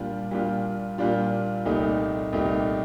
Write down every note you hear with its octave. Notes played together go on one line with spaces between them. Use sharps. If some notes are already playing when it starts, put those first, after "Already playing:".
Already playing: A#2 G3 D4 F4
A#2 G3 D4 F4
A#2 G3 D4 F4
C2 A#2 A3 D#4 G4
C2 A#2 A3 D#4 G4